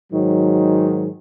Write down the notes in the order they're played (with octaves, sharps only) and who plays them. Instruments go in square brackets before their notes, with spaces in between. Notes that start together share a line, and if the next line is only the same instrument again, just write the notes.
[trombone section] G#2 D#3 F#3